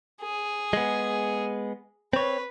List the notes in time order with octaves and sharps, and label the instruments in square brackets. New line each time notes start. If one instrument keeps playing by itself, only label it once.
[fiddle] G#4
[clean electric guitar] G#3 B3
[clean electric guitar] C4 C#5 [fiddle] B4